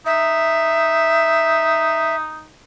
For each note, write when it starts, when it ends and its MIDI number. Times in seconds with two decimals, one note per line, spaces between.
0.06 2.48 63
0.06 2.16 76